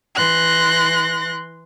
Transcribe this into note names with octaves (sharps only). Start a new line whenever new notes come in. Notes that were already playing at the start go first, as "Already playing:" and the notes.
E3 C6 F#6 A#6